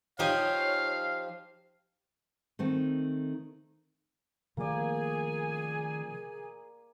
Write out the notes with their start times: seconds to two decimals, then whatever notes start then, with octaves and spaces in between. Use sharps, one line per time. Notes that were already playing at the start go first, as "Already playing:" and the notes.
0.19 F3 D#4 G4 C#5 F5 G#5
2.59 D#3 A3 C4
4.57 C3 D#3 F3 A3 A#3 G#4 D5 G#5